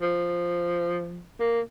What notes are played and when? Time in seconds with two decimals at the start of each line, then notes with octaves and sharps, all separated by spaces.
0.02 F3
1.40 A#3